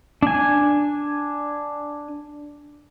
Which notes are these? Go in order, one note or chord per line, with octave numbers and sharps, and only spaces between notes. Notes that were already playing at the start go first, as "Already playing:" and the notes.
D4 G#5